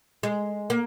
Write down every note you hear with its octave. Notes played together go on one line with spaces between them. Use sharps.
G#3
A#3